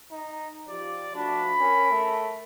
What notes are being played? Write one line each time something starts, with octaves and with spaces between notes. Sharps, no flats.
D#4
F3 F4 G4 D5
F3 A3 D4 F#4 B5
C#4 A#4
A3